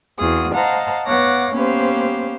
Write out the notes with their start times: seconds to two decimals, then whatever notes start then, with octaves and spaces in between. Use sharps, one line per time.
0.18 E2 C4 F4 F#4 G#4 D#6
0.53 C5 D#5 F5 F#5 A5 A#5
1.05 B3 C#5 F5 F#5 D6 A#6
1.53 A#3 B3 C#4 G4 C5 F5